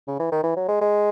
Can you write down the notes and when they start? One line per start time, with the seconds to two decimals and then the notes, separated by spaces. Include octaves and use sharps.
0.07 C#3
0.20 E3
0.32 D#3
0.44 E3
0.56 F#3
0.69 G#3
0.81 G#3